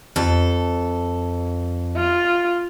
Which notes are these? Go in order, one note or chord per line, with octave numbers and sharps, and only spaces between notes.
F2 A4
F4